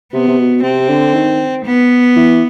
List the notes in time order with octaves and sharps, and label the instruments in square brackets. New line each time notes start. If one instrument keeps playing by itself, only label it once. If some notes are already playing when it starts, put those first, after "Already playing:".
[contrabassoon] C3 [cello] B3
[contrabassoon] C3
B2
[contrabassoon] C3 [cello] C4
[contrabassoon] D3
D#3
[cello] B3
[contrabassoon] E3